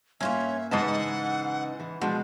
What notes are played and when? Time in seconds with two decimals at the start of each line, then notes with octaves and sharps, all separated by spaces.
0.21 G2 A#3 C#4 F4 C#5 E5
0.71 G#2 C#3 E3 D#4 B4 D#5 F#5 A5
1.80 E3
2.01 B2 F3 G#3 D4 F#4